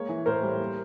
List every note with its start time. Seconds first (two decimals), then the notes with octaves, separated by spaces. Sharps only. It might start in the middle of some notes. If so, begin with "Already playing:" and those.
Already playing: G#3 A#3 C#5
0.09 E3
0.26 A2 A#4 C5
0.43 G3
0.59 A#3